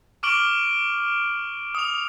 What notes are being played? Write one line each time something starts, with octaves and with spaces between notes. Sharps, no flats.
C#6 D6 F6 D7 F#7 G7
D#6 F7